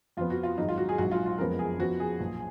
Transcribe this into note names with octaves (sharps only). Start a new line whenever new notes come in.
F2 F3 B3 F4
F#4
F4
G#1 G#2 F#3 D#4
F4
F#4
G#4
A#1 G#2 F#3 F#4
F4
F4
F#1 F2 F3 G#3 B3 A#4
G#4
F2 F3 B3 F#4
G#4
B1 A#2 F3